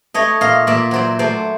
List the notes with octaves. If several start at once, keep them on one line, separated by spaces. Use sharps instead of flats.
A3 C#5 D#5
A#2 D#5 F5
A#2 D5 E5
F#3 C5 D5
A3 C5 D5